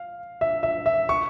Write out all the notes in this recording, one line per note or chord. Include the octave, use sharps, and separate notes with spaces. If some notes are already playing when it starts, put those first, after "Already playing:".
Already playing: F5
E5
E5
E5
C#6